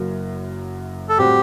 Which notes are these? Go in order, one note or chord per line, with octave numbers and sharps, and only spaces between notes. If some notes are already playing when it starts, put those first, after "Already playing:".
Already playing: F#1 F#2 F#3 A#3
A4
A2 G3 C4 F#4 G4